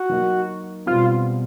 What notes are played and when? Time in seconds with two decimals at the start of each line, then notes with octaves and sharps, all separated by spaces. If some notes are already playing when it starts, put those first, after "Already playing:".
Already playing: F#4
0.10 F#3 A#3 D#4
0.86 B2 G3 C4 F4